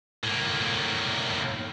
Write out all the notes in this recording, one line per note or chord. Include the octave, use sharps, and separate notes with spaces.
A2 A#3